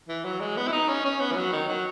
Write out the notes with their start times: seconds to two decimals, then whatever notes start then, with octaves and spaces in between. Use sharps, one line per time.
0.08 E3
0.25 F#3
0.40 G#3
0.57 B3
0.67 E4
0.73 D#4
0.89 C#4
1.05 C#4
1.20 B3
1.31 E3
1.36 F#3
1.52 D#3
1.68 F#3